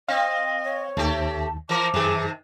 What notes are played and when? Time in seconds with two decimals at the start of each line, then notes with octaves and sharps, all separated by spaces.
0.09 C4 D#5 F5
0.64 C#5
0.97 D#2 D#3 A3 G4 A5
1.69 E3 F3 A#4 A5 D6
1.94 F#2 C3 D#3 G#4